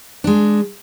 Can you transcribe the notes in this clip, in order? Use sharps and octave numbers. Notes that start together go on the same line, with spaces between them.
G#3 D4